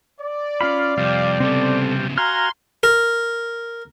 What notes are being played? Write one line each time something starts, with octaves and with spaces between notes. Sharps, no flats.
D5
C#4 F4 F5 B5
F2 C3 G3 F5
C#3 B3 C4 A4
F#4 F5 G#5 A#5 C6 F6
A#4